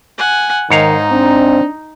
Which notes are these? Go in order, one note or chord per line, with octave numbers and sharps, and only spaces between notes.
F#5 G#5
G#2 D#3 D#4 C#5 F5
C4 D4